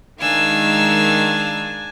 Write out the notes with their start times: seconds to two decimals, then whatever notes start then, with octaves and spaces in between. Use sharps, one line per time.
0.21 D#3 G#3 D4 F5 G#5 E6